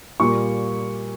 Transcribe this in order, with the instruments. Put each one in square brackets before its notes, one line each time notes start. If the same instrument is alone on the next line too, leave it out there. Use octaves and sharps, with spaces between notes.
[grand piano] A#2 G3 A#3 C#6